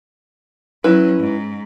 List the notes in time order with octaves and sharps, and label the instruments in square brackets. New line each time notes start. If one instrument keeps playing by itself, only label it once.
[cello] F#3 C#4 [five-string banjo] E4 B4
[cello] G#2